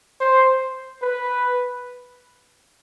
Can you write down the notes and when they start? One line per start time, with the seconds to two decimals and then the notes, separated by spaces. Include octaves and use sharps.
0.20 C5
1.02 B4